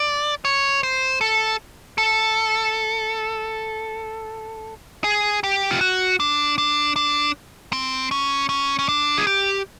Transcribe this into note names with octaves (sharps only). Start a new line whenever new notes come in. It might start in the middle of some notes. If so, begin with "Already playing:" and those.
Already playing: D5
C#5
C5
A4
A4
G#4
G4
F4
F#4
D4
D4
D4
C4
C#4
C#4
C#4
D4
G#4
G4